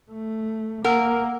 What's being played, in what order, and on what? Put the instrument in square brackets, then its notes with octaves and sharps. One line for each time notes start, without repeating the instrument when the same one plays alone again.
[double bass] A3
[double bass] A#3 [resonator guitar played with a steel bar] A#4 [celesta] F#5 E6